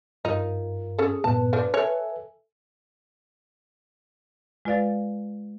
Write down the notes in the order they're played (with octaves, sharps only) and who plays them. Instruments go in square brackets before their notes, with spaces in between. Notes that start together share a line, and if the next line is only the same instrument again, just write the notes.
[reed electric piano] G2 F4 A#4 [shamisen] D#4
[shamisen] C#4 A4 [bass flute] G#4
[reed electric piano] G2 A#2 B3 [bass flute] B4 [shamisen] A5
[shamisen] D3 F3 D4
[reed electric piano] A4 E5 G#5 [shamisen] C#5
[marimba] G#3 F4 B4 D5 F5 A6